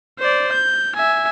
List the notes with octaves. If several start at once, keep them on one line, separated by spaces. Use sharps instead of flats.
C5 D5
G6
E5 G#5